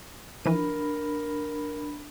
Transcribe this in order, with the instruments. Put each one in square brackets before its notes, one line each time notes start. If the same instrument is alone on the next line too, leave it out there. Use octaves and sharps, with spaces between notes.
[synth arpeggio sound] E3 F3 D#7 [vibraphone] D4 B5 [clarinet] A#4